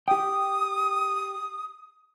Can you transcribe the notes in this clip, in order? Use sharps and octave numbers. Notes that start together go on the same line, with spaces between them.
G4 G5 D#6